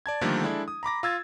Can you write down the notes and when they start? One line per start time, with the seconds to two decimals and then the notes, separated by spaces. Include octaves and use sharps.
0.06 D5 A5 G#6
0.21 D3 D#3 F3 G3 A3 A#3
0.43 G#3 D4 E4 A4
0.68 D#6
0.83 A#5 B5 D6 A#6
1.03 F4 E6 G#6 A6